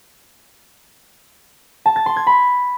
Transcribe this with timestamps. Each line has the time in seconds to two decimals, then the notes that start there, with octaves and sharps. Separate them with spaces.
1.86 A5
1.96 A6
2.06 C6
2.16 G#6
2.27 B5